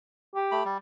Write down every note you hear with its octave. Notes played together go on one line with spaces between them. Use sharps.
G4
A3 B5
G3